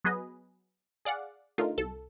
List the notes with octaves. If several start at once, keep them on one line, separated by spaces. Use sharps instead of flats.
F#3 B3 G#4 B4 D#5
G#4 D5 F5 F#5
D3 A3 D#4 F4 A#4
C2 A4